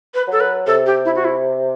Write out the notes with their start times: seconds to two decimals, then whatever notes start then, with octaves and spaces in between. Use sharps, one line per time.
0.14 B4
0.27 F#3 A4
0.40 B4
0.67 C3 A4
0.86 G4
1.05 E4
1.16 F#4
1.25 E4